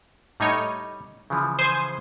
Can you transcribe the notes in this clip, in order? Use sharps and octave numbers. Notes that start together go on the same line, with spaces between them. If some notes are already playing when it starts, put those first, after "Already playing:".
A2 G3 D#4 C#5
C#3 E3 F3
C5 G#5 C7